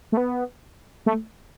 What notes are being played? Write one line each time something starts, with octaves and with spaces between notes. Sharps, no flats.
A3
B3
A3